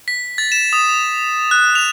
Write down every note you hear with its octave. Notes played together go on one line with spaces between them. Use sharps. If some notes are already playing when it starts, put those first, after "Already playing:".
B6
A6
E7
D#6
F#6
F7